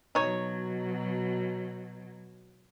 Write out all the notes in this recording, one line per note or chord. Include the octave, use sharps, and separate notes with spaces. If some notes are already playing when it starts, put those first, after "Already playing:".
B2 F#3 D#4 C#5